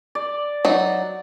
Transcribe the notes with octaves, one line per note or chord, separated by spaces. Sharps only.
D5
F#3 D#4